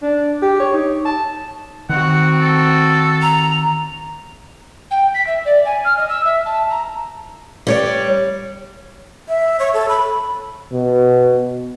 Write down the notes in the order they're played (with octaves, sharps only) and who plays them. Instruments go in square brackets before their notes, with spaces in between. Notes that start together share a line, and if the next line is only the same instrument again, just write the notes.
[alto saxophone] D4
G4
C#5
D#4
A5
[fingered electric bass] D#3 [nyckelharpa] C4 F#4 [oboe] F#5
[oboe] A4
[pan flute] A#5
[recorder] G5
B6
E5
D5
G#5
F6
D#5
E6
E5
A5
A#5
[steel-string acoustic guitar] G3 C#5 D5
[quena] E5
C#5
A4
B5
[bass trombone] B2